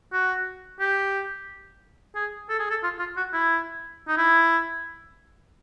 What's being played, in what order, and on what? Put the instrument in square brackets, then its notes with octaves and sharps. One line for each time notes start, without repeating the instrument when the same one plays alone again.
[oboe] F#4
G4
G#4
A4
G#4
A4
F4
F4
F#4
E4
D#4
E4